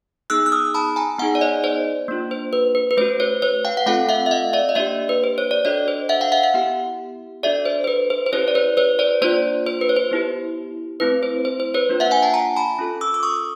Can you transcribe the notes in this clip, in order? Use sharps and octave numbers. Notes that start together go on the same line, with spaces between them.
B3 D#4 G#4 E6 F#6
F#6
D#6 F6
A5 B5
G#5 A#5
B3 D#4 G#4 F#5 G#5
D5
C#5 D#5
C5 D5
A#3 D4 F4
C5
B4
B4
B4
A3 C#4 F#4 C5
B4 C#5
B4 C#5
F5 G5
F#5
A3 C4 F4 A4 F5 G5
E5 F#5
E5
D#5 F5
D5 E5
D#5
A#3 D4 G4 D5 E5
B4
C5
C#5
D5
D4 F#4 A4 C#5 D#5
C5
E5 F#5
F5 G5
E5 F#5
E5 F#5
B3 E4 G4
D4 F#4 A4 D5 E5
C5
C5
B4
C5
C5
C#4 E4 G4 B4 C#5
D5
B4 C#5
B4 C#5
C5 D5
A#3 D4 F4 C5 D5
C5
B4
C#5
C5
B3 E4 G4
A3 C4 E4 B4
C5
C5
C5
B4 C#5
A#3 D4 F4
E5 F#5
F#5 G#5
G5 A5
G#5 A#5
A5 B5
C#4 F4 A4
D6 E6
D6
C#6 D#6